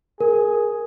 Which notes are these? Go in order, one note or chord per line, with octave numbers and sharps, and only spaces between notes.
G#4 A#4